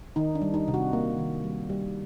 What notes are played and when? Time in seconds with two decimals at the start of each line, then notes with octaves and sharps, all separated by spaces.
0.16 D#3 D#4
0.35 D4
0.42 G3
0.54 D#4
0.68 C3
0.74 F#4
0.93 A#3
1.18 D#3
1.44 G3
1.70 G3 G4